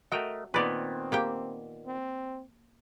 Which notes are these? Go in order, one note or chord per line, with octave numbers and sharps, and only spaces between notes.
A3 F#4 A#4 D#5 G5
A#2 D#3 B3 C4 B4 D5
A#3 G4 G5
C4